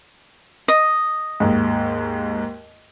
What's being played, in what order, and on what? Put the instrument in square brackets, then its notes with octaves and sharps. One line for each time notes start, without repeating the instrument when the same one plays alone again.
[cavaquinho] D#5
[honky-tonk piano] D#2 G#2